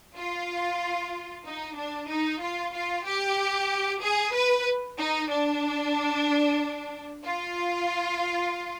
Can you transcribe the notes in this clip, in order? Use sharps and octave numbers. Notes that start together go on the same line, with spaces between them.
F4
D#4
D4
D#4
F4
F4
G4
G#4
B4
D#4
D4
F4